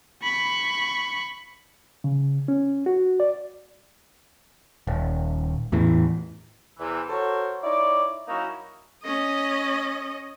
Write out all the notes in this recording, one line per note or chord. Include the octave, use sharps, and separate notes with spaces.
B5 C#6
C#3
C#4
F#4
D5
D#1
E2 A2 E3
E2 C3 E3
F#4 A4 A#4 C5 C#5
D#4 E4 C#5 D5
F#3 A#3 C#4 D#4 E4 F#4
C#4 D#5